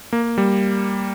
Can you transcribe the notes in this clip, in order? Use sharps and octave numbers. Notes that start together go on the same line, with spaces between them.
A#3
G3